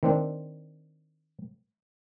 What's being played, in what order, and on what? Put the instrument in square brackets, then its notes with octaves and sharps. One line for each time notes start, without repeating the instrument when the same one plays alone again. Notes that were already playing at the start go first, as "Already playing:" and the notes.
[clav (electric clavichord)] D#3 C4 D4